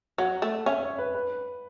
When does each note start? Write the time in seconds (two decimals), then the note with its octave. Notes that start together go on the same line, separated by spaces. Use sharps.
0.18 F#3 F#5
0.42 A3
0.66 C#4 E5
0.83 C#5
0.98 B4
1.15 B4